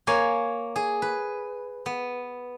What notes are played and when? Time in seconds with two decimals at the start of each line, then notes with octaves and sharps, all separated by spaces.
0.07 A#3 C#5 G#5
0.76 G#4
1.02 B4
1.86 B3